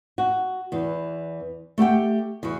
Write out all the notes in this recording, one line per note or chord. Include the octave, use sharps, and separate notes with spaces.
F#4
E2 E3
A3 G4 F#5 G5
E2 F#4